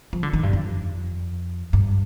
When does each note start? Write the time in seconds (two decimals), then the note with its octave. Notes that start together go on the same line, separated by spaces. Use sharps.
0.13 F3
0.23 D3
0.33 D#3
0.43 G2
0.53 F2
1.73 G2